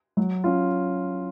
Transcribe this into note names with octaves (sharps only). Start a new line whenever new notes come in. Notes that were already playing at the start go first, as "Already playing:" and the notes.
F#3
C#4 F4